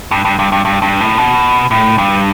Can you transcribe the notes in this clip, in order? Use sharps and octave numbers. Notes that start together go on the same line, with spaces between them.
G2
G2
G2
G2
G2
G2
A2
B2
A2
G2